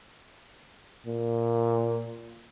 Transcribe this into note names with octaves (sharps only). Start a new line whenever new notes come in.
A#2